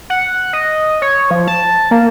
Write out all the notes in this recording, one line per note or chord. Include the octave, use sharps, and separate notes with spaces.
F#5
D#5
C#5
F3
A5
A#3